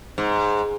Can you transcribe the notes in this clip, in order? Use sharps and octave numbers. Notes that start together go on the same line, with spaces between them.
G#2